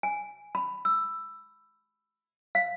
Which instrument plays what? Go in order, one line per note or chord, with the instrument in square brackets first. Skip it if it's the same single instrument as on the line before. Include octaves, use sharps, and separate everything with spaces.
[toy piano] G#5
B5
E6
F5